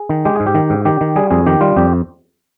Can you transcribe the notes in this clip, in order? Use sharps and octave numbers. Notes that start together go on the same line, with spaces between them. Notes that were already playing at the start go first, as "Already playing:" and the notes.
Already playing: G#4
D#3
G#3 G4
G#2 G#4
G4
D#3
G#2
D#3 G4
D#3
G3 G#4
F2 G#4
D#3 G4
G3 F4
F2 G4